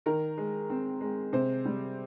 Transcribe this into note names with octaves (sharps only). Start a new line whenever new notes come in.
D#3 A#4
G#3
C4
G#3
C3 C5
G3